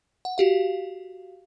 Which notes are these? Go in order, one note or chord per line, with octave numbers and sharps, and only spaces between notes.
F#5
F#4 G4 F5